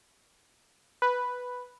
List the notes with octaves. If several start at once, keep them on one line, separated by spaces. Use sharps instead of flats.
B4